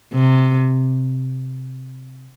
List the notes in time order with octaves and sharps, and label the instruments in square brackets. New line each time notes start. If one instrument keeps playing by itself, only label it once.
[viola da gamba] C3